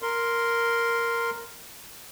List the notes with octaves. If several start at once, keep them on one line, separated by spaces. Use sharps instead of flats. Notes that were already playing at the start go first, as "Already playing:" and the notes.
A#4 C6